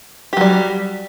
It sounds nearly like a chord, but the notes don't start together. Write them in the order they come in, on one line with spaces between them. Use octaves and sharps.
G4 F#3 G3